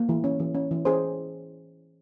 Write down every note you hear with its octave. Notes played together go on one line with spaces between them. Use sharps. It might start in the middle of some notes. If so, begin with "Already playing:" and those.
Already playing: A#3
E3
C#4
E3
C#4
E3
C#4 G#4 C5